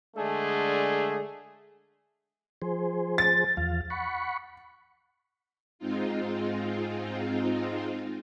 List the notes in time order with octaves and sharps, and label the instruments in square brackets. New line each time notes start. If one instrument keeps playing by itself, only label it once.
[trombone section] D3 G#3 A3 D4 G#4
[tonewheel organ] F3 G#4 C5
[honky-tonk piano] A6
[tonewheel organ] E2 F3 F5
F#5 B5 C#6
[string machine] G#2 G#3 C4 D#4 F4